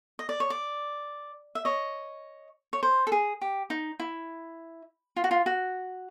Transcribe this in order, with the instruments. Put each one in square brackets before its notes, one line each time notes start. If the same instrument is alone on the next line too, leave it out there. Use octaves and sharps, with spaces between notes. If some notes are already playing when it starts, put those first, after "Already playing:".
[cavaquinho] D#5
D5
C#5
D5
E5
C#5 D#5
C#5
C5
A4
G#4
G4
D#4
E4
F4
F#4
F4
F#4